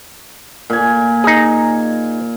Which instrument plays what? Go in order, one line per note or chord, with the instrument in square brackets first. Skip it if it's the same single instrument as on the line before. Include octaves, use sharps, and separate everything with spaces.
[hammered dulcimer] A#2 G#5
[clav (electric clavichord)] D#4 G#4